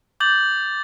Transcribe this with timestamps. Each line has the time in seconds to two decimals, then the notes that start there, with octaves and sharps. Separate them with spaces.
0.20 D6 G6 A6 F#7